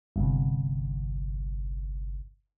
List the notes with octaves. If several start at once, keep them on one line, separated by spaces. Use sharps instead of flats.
G1 C2